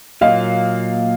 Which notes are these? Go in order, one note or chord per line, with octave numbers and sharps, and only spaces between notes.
A#2 F#3 A#3 D#5 F5